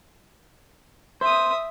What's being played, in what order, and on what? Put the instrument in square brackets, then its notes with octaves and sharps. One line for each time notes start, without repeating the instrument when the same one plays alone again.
[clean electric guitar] C5 [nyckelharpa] E5 D#6